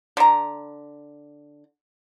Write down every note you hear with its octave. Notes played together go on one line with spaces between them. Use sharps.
D3 A#5